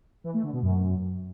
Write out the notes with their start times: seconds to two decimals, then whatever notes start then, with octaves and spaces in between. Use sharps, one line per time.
0.24 E3
0.34 A3
0.43 D3
0.53 B2
0.62 F#2